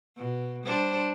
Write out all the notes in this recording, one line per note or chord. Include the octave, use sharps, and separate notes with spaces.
B2
G3 D4 C5